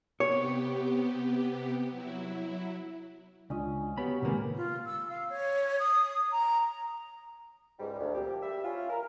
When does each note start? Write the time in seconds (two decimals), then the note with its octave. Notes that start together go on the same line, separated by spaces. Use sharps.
0.20 C3 B3 G4 C#5
1.91 F#3 E4
3.50 C#2 C#4 D4 F4 D#5
3.98 B3 F#4 G4 B4 C#5 B5
4.22 A2 C3 D#3 G#3 A#3 G#5
4.56 F4
4.86 E6
5.09 F5
5.29 C#5
5.80 D#6
6.32 A#5
7.79 C#2 G#2 G3
8.00 D2
8.15 A#2 F3 C4 G4
8.43 G3 E5
8.65 C#4 E4 F4
8.90 A#4